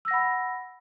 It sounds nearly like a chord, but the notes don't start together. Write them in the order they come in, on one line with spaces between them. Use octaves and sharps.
E6 A#6 F#5 B5